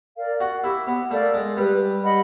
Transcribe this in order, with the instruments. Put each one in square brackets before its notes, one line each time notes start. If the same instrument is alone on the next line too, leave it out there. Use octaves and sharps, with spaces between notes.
[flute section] A#4 D5 F5
[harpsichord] F#4
[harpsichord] E4 [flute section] G4
[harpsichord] B3
[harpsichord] A3 [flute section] A#4 D5 F5
[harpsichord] G#3
[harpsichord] G3 [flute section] B4
[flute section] D#5 F#5 B5